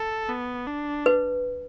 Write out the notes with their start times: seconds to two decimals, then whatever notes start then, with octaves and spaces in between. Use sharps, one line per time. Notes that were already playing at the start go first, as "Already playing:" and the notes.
Already playing: A4
0.29 B3
0.67 D4
1.06 B4